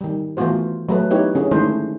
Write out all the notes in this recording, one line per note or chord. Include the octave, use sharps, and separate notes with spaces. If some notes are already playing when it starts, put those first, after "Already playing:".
D#3 G3
E3 A3 B3 F4 F#4 C5
F#3 A3 B4
B3 D#4 E4 G4 B4 C#5
D3 C#4 E4 G#4
D#3 G#3 A3 D4 E4 C5